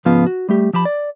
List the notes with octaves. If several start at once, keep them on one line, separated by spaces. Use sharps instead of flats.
C#2 G#2 C#3 F3 B3 F5
F#4
G3 A3 G4
F3 G4 A5 B5
D5